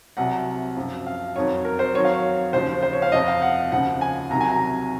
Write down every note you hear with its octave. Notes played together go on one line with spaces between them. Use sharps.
C2 C3 F#3 F#5
F#2 F3
F5
F2 D#3 F#3 C#5
A#4
C5
F2 D#3 F#3 C#5
F5
C#5
D#2 C#3 F3 C5
C5
C#5
F5
F2 C3 F3 D#5
F5
F#5
D#2 C#3 F3 F#5
G#5
C2 C3 D#3 F#3 A#5
G#5
A#5